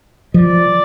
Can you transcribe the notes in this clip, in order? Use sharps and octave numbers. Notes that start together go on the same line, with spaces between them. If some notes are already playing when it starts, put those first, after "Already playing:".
F3 D5